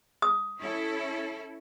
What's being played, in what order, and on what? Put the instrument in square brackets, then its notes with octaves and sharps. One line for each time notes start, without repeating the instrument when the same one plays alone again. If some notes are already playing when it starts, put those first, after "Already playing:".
[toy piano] D#6
[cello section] C#4 E4 A4